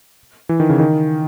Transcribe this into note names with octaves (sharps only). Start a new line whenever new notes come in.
E3
D#3
C#3
D#3